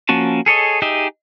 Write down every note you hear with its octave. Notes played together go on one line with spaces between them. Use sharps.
F3 A#3 C#4 F#4 A5
G#4 A4 C#5 D#5
D#4 G4 G#4 D#5 E5